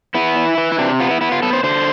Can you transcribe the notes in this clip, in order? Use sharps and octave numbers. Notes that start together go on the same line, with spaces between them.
B3 E4
E3
E3
E4
C3 D4
B3 F4
E4
B3 E4
F4
B3 A4
C5
D3 C5